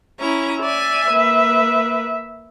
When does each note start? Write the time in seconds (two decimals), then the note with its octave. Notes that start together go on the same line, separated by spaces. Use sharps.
0.19 C#4 E4 A#5
0.62 D5 E5 G#5
1.07 A#3 B4